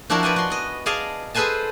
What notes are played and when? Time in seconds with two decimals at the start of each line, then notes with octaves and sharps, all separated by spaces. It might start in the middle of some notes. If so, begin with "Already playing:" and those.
0.10 F3 D4 E4 F#4 A#4 C5
0.23 B4 D5 D#5 G#5
0.36 F#4 C6
0.50 B3 D#5
0.86 G#4 D5 D#5 F5 G#5 A5
1.34 G#4 A4 B4 C5 G#5 A5